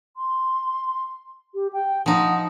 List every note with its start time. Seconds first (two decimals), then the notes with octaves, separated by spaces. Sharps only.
0.17 C6
1.54 G4
1.73 G5
2.06 F3 D#4 F#5